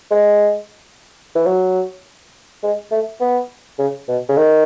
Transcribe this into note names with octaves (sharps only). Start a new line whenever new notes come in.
G#3
E3
F#3
G#3
A3
B3
C#3
B2
C#3
D#3